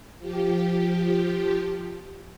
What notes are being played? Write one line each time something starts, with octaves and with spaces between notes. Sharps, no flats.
F3 G4